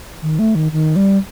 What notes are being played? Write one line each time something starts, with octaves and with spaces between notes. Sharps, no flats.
D#3
A3
D#3
D#3
G3